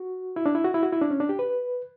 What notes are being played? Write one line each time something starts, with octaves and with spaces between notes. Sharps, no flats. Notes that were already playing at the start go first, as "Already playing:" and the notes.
Already playing: F#4
E4
D4
E4
F#4
E4
F#4
E4
D4
C#4
D4
G4
B4